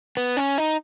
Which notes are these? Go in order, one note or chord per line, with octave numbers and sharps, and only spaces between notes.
B3
C#4
D#4